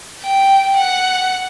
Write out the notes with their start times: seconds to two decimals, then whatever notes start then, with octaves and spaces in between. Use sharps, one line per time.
0.21 G5
0.76 F#5